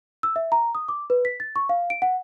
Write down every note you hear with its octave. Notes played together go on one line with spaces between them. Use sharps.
E6
E5
A#5
D#6
D6
B4
B6
A6
C#6
F5
D7
F#5